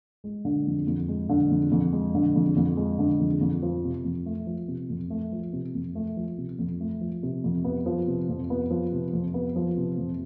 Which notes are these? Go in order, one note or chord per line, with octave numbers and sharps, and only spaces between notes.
G#3
D3
F2
F2
G#3
D3
F2
F2
G#3
D3
F2
F2
G#3
D3
F2
F2
F3
C3
F2
A3
F3
C3
F2
A3
F3
C3
F2
A3
F3
C3
F2
A3
F3
C3
F2
B3
F3
C3
F2
B3
F3
C3
F2
B3
F3
C3
F2